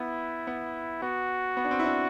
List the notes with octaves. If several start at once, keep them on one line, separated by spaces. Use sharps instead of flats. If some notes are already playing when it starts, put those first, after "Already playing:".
Already playing: B3 E4
B3
B3 F#4
B3
D4
C4
E4
D4